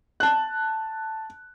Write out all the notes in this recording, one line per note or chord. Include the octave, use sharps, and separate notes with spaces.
A5 F#6